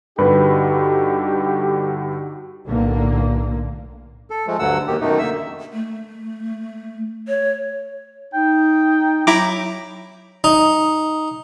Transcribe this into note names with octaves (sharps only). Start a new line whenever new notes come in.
G2 D3 D#4 F#4 G4 B4
B1 A2 D3 A#3
A4
F3 G#3 A3
D2 G2 D3 F#3 F#5 E6
D#2 B2 D#3 G4
F#2 B2 D#3 A3 D#4
D3 A#3 E5 E6
A3
C#5
D#4 G5
F#3 E4 A#5 D6
D#4